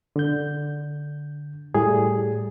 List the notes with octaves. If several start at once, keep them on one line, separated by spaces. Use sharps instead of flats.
D3 G6
A2 G3 A3 G#4